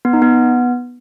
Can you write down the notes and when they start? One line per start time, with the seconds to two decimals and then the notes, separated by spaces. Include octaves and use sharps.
0.05 B3
0.13 D#4
0.22 B3